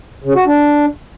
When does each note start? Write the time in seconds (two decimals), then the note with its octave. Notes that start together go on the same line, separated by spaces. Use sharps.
0.24 C#3
0.35 F#4
0.46 D4